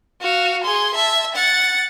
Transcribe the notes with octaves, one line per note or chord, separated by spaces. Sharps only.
F#4 F5
G#4 C6
E5 A5
F#5 A6